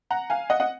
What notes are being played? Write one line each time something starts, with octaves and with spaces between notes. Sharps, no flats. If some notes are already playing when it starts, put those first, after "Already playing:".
F#5 A#5
F5 G#5
D#5 F#5
D#5 F#5